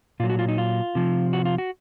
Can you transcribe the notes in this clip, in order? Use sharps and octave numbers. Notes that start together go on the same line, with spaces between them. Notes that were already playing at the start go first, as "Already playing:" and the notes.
A#2 F#3 F4
F#4
F4
D#4
F4
C3 F3
F#4
F4
F#4